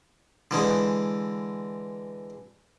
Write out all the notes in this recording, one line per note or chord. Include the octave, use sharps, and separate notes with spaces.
D3 E3 G#3